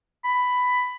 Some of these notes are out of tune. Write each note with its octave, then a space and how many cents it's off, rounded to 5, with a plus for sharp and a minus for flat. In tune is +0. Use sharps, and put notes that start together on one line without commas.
B5 +10